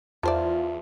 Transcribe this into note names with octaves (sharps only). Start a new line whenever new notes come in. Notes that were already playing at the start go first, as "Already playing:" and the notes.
E2 D#3 F4 C5 D5 E5 A5